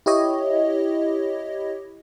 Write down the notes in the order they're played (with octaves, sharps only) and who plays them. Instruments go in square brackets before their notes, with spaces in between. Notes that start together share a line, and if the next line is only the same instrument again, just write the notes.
[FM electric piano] E4 G4 C#5 D#5